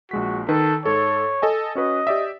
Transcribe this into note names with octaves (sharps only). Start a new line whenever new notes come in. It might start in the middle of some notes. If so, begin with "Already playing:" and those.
A#1 G#3 F#4 B6
D#3 A4 B4
G#2 A4 C#5
A4 D#5 G#5
C#4 F#4 B4 D#5
G4 D5 E5